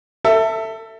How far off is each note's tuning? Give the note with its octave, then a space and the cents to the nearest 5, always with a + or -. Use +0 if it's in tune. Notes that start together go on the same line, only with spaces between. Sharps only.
A4 +25 E5 +0